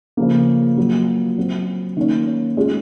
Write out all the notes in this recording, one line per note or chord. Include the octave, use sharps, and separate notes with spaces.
C#3 F3 A#3
F#3 A#3 F4
F#3 C4 F#4
D#3 A#3 C#4
G#3 C#4 F4 G#4